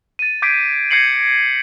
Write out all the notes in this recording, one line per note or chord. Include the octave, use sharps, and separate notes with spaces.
A6 D#7
D6 G6 G#6 B6 C7 D7
G6 G#6 A#6 C7 C#7 F#7